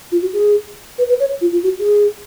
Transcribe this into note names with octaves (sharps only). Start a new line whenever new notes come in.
F4
F#4
G#4
B4
B4
C#5
F4
F4
F#4
G#4